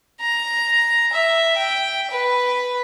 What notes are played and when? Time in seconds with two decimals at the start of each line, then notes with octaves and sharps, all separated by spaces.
0.21 A#5
1.13 E5
1.57 G5
2.11 B4